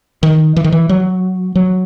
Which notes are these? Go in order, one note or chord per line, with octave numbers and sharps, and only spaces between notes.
D#3
E3
D#3
E3
F#3
F#3